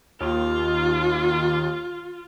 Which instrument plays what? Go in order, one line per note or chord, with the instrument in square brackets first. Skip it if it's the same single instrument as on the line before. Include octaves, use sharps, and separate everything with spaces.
[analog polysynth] D#2 [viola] F4